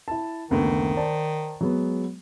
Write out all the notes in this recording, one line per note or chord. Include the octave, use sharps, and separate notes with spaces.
E4 A5
F#1 D2 D#3 B3
C5 D5 A5
F#3 G#3 B3